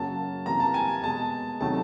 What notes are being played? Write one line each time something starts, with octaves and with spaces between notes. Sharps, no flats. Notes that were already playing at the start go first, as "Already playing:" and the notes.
Already playing: F#2 C#3 F#3 A#3 A5
C3 E3 G3 A#3 A#5
A5
G#5
B2 G#3 A5
C3 D#3 F#3 A3 A5